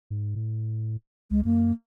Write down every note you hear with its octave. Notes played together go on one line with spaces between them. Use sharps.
G#2
A2
C#2 G#3
F#2 A#3